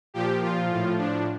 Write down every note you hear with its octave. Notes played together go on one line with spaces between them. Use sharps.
A#2 F3 G4
F4
A2 F3
D4